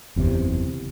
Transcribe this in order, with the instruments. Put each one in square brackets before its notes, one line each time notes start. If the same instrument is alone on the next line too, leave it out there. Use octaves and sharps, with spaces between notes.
[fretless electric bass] F#1 E2 G#2 C3